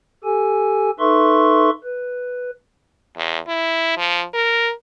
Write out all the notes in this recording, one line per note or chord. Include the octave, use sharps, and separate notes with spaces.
G4 A4 G#5
D#4 A4 B4 E5 C6 C#6
B4
E2
E4
F3
A#4